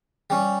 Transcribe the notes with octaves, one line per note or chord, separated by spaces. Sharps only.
G3 C#4